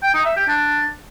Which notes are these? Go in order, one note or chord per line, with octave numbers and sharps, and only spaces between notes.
G5
D#4
E5
G4
D4